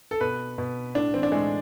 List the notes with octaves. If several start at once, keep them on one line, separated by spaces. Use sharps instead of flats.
A4
B2 B4
B2
A2 D4
E3 C4
D4
A2 G#3